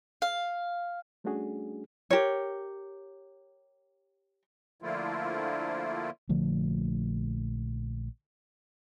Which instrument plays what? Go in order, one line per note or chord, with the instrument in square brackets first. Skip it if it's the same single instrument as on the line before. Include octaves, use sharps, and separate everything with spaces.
[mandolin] F5
[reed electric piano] G3 A3 C#4 D4 F#4 G#4
[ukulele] G4 A#4 C#5
[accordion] D3 F3 A3 A#3 E4 F4
[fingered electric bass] A#1 D3 F3 A3